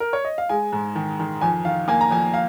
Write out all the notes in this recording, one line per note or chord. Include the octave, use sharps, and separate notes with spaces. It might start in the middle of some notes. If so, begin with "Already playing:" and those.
A#4
C#5
D#5
F5
G#3 G#5
G#2
D#3
D#3
F2 G#5
D#3 F5
A#3 G#5
A#5
F2 G#5
F5